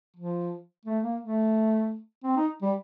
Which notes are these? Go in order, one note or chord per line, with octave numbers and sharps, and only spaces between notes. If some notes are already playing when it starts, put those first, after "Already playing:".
F3
A3
A#3
A3
C4
D#4
G3